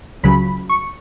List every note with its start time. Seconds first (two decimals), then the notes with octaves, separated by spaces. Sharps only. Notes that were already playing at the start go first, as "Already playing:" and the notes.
0.23 C#2 C#3 F#3 B5
0.69 C#6